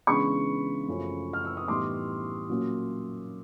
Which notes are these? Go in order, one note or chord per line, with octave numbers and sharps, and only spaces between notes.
C#3 E3 G#3 B3 D4 B5 C#6
F#2 C#3 F3 A3 C#4
F6
E6
D#6
A2 E3 G3 B3 D#4 C6 D6
A#2 F#3 A#3 C#4